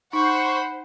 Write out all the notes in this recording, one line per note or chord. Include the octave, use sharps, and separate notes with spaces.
D#4 C5 F#5 B5 C#6